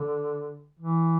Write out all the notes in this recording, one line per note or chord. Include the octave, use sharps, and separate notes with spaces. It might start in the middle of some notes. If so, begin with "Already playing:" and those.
Already playing: D3
E3